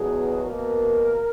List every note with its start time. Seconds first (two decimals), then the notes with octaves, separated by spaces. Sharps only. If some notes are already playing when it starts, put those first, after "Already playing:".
Already playing: E2 B2 F#3 B3 G#4
0.45 B2 A#3 A#4